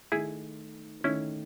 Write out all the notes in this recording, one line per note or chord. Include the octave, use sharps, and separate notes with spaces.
D#3 A3 D#4 E4 G#4
D#3 A3 C#4 D#4 E4